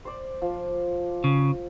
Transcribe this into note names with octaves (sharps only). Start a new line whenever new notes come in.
C5 D5
F3
C#3